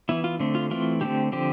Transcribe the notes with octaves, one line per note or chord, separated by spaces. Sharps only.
E3 B3 E4
F4
D3 A3 C4
F4
E3 A3 C4 F4
D3 A3 C4 G4
D3 F3 C4 G4